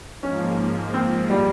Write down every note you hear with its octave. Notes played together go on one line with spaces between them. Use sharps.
G#2 F3 A#3 C#4
C4
G3